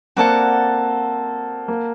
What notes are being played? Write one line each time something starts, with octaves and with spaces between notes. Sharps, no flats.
A#3 C4 F#4 A4 D5 F#5
A#3